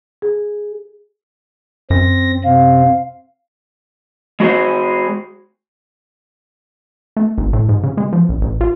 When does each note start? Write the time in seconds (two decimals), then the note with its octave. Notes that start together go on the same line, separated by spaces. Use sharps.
0.22 G#4
1.90 F#2 C4 A#6
2.44 C3 C4 F5
4.40 G#3 F#4 G#4 C5
7.16 A3
7.38 G#1
7.53 A2
7.69 G#2
7.84 C#3
7.97 G#3
8.13 F3
8.29 A#1
8.42 A1
8.61 F4